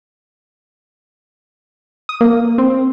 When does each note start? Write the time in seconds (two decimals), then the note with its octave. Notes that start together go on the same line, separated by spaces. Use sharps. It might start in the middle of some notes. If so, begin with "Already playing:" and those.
2.09 D#6
2.21 A#3
2.58 C4